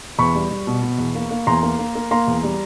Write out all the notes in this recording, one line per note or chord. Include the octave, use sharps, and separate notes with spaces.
E2 B5 C#6
G3
G3
B2
B2
E2
A#3
A#3
E2 A#5 C6
A#3
A#3
A#3
A#3 A#5 C6
E2
G3